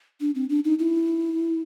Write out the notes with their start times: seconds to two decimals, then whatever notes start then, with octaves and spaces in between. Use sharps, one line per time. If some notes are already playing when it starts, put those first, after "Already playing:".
0.21 D4
0.35 C4
0.50 D4
0.65 D#4
0.79 E4